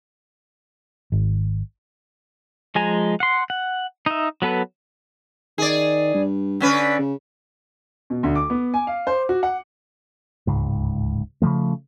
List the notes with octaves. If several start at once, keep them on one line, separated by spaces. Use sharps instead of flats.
G#1
F3 G#3 G#5 A#5
F#5 C6
F#5
D#4 E5
F#3 B3 A4 B4
D#3 G#4 D5
G2
D3 C#4 B4
C#3
B2
D2
D6
B3
G#5
F5
C5
F#4
F#5
D1 C#2 G#2
C#3 E3 F3 A3